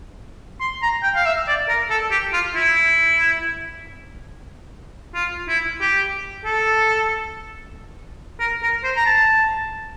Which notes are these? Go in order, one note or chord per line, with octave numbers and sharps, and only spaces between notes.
C6
A#5
G5
F5
E5
D5
A#4
A4
G4
F4
E4
F4
E4
G4
A4
A#4
A#4
C5
A#5
A5